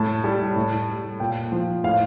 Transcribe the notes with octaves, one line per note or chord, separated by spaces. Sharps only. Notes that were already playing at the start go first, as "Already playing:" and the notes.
Already playing: A2 A5
G3
A2
G3
A#2 G5
F3
A2 F5